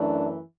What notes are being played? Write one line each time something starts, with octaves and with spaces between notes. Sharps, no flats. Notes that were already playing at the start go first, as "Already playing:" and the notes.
Already playing: F#2 E3 A3 D4